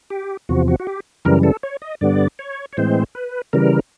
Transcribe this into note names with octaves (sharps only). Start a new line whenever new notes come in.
G4
E2 C3 F3 F#4
F#4
F#4
G4
F#2 C#3 E3 G3 A#4
A4
C#5
D#5
G2 D3 G3 B3 D5
C#5
C#5
A2 E3 G#3 C4 C5
B4
C#3 E3 G3 A#4